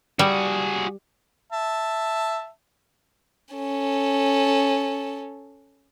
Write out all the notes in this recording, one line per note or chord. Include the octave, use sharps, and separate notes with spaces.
G3 F#4 G#4
E5 A5
C#4 A4